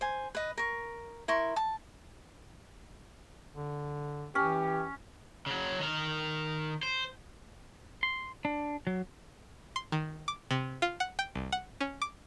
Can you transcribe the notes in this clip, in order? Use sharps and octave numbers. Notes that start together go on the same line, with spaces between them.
C5 G#5
B4 D#5
A#4 C#6
E4 A#4 C6 C#6
A5
D3
E3 C#4 G4
C#3 F#3
D#3 A#4
C5
C6
D4
F#3
C6
D#3
D6
C3
F4
F#5
G5
C2
F#5
C#4
D6